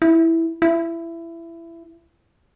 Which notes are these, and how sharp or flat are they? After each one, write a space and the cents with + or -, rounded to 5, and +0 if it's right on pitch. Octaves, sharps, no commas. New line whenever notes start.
E4 -5
E4 +20